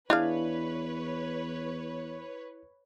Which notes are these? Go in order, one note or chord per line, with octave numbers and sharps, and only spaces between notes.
E2 D4 E4 G#4 B4 C#5 F5